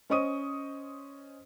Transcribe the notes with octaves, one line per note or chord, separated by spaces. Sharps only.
C#4 C5 D#5 C#6 D#6 D#7